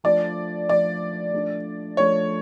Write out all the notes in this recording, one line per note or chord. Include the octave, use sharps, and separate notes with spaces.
F3 A3 D4 D5
F3 A3 D4 D5
F3 A3 D4
F3 A3 D4 C#5